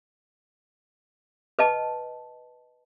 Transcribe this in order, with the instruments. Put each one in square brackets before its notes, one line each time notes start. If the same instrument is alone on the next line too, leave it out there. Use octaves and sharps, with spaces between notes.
[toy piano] B4 D#5 A5